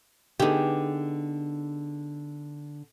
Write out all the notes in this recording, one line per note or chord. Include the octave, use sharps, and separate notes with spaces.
D3 B3 D#4 G4 G#4